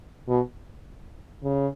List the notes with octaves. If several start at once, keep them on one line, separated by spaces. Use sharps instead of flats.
B2
C#3